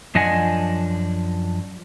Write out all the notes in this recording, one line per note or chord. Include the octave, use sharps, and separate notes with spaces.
F#2 F3 D4 D#5 F#5 G#5